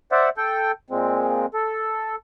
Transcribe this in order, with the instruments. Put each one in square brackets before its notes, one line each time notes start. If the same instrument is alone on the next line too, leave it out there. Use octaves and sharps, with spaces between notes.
[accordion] C5 D5 E5 F#5
A4 G5
A#2 G#3 C4
A4